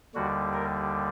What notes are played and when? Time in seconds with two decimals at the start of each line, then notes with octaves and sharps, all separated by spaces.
0.15 D#2 D3 G3 F#4
0.53 A#4